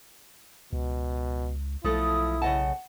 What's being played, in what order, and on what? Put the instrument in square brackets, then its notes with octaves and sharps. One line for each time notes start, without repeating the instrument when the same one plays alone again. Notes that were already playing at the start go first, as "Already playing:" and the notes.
[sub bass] C#2 [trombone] B2
[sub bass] B1 [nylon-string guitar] F3 A3 A4 [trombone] E4 [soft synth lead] D#6
[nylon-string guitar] C#3 D#5 A5 [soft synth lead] F#5